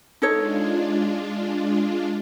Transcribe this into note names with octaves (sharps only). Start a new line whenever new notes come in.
G#3 D4 D#4 F4 A4 C#5